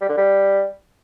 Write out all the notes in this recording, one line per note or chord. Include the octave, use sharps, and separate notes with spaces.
G3
D3
G3